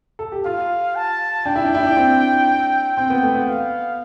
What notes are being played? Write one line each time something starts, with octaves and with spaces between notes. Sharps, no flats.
A4
G4
F4 F5
A5
D4 G5
E4
D4
E4
D4
C4
C4 G5
B3
A3
B3
F5